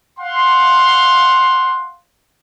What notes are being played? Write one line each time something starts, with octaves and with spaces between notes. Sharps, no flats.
F5 F#5 C6